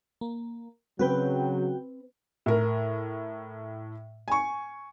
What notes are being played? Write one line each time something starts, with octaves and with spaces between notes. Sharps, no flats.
A#3
C#3 F#3 C4 F#4 B4 G5
A2 A#4
G#5 C#6